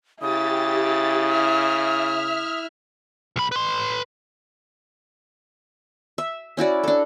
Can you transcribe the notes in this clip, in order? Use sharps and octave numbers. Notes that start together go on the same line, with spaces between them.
C#3 E4 G4 D#6 A6
E5 F6
B1 B5
B4 C6
E5
C#4 E4 F#4 D5
D4 A4